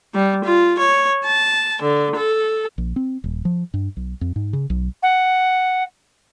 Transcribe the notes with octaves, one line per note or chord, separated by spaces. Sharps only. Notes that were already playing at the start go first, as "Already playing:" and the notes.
G3
F4
C#5
A5
D3
A4
A#1
C4
D#1
F3
G2
B1
F2
G#2
C#3
B1
F#5